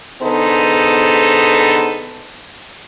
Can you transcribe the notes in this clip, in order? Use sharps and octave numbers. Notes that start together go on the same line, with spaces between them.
D3 B3 D#4 G#4 A4 C5